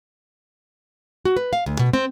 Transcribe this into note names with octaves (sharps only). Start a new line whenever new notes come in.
F#4
B4
F5
D2
B2
C4